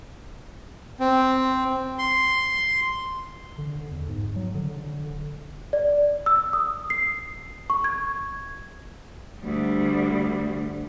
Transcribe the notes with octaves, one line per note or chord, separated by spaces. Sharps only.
C4
C6
D3
E2
G#2
F#3
D3
D3
D1
D5
E6
D#6
C7
C#6
G#6
D2 G3